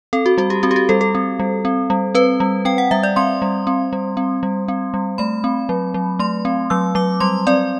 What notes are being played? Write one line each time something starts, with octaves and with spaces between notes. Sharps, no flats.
C4 A4
F#4
G3 F#4
G4
C4 F#4
G4
F#4
G3 A4
A4
C4
G3
C4
G3
C4 B4
G3
C4 G5
F#5
G3 E5
D5
C4 C6
G3
C4
G3
C4
G3
C4
G3
A3 B5
C4
F#3
F#3
A3 C6
C4
F#3 E6
F#3 D6
G3 C6
C4 D5